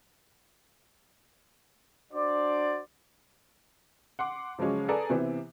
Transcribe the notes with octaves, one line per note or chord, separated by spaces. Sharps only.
D4 F#4 C5 D5
F#5 C6 D6
C#3 F3 F#3 G#3 C#4
G#4 A4 B4 D5 G#5 A#5
C3 E3 B3 C4